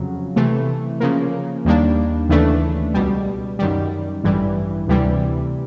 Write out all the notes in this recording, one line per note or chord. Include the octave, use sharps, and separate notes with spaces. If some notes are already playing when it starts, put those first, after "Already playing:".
Already playing: F2 C#3 F#3
C3 E3 A3
C#3 F3 A#3
D#2 D#3 G3 A#3 D4
D#2 C#3 E3 A3 D4
C#2 B2 G3
F#2 D#3 G3
A1 G2 E3 G3
D2 C3 E3 G3